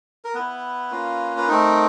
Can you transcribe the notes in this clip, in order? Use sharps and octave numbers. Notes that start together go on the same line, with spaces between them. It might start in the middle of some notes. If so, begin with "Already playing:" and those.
A#4
B3 E4 B4
A#3 C#4 F4
B4
A3 C4 D#4 A#4